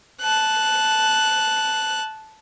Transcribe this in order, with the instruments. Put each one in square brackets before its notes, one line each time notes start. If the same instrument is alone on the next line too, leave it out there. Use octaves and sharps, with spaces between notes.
[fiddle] A5 F#6